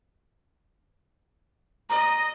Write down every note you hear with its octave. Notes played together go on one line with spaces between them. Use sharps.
D#5 A#5